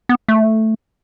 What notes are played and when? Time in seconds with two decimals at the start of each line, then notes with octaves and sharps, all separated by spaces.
0.09 B3
0.28 A3